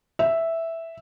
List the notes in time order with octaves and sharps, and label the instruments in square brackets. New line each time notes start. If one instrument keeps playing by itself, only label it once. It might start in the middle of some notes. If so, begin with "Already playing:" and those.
[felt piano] E5